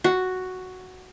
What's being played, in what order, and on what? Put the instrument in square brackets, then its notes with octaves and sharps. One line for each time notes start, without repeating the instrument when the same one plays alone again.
[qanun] F#4